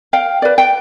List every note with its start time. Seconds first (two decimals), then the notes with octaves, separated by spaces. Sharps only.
0.13 F5 G5
0.42 B4 D5
0.58 G5